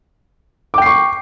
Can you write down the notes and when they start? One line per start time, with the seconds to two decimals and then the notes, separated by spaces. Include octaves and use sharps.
0.74 D6
0.78 G5
0.82 C7
0.86 C#6